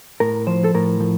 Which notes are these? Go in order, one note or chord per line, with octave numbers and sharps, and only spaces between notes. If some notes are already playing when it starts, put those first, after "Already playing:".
A2 A#4
F3 C5
A4
A2 A#4
F3